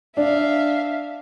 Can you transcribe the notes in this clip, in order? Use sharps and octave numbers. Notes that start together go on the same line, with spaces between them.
D4 E5 F5